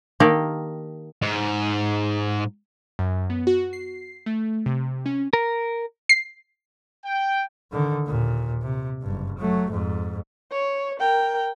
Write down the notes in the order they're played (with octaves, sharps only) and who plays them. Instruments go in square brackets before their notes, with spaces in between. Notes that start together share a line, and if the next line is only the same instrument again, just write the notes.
[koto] D#3 A#3 G4 A4 D5
[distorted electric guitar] G#2
[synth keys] F#2
B3
F#4
C7
A3
C3
C#4
[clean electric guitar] A#4
[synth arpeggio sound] C7
[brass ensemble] G5
[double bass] D3 D#3
D#2 A#2
C3
F#1 G2
F#3 A3
F2 G#2
[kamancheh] C#5
A#4 G5